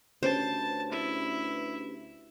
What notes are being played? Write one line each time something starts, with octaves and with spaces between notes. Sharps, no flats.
D2 C#4 G4 B4 C5 A5
E4 E5